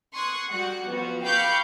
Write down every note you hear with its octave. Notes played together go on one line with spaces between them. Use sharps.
C6 C#6 D#6 F#6 G#6
G3 F#4 F#5 F#6
F3 B3 F#4
F5 G5 B5 C#6 D6 G6